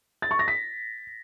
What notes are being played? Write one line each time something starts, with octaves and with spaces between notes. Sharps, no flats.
A6
C#6
A#6
B6